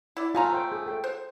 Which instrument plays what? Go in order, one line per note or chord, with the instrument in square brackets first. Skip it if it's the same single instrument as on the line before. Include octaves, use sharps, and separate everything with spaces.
[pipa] E4 D5
[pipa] A3 G#5 A#5 [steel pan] F4
[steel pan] C5 G5
G#4 D#6
A4 G5
[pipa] C5